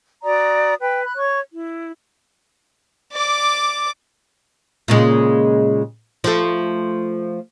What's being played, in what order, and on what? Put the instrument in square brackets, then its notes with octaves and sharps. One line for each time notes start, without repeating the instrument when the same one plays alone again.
[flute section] F#4 D5 A#5 D#6
B4 G5
B5 F#6
C#5 C#6
E4
[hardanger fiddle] D5 D6
[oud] A#2 C#3 G#3
F3 A3